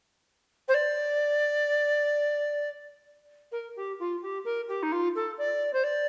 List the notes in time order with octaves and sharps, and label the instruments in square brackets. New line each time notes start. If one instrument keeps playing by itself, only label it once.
[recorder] C5
D5
A#4
G4
F4
G4
A#4
G4
D#4
F4
A4
D5
C5
D5